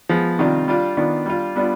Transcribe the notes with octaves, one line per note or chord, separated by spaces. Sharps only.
F3 G#3 B3
C3 D#3 G3 D4 F4
G3 D4 F4
D#3 B3 D4 F4
G3 D4 F4
G3 B3 D4 F4